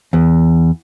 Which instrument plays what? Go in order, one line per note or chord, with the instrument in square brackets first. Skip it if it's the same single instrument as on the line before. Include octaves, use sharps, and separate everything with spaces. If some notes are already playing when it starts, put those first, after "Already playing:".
[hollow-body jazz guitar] E2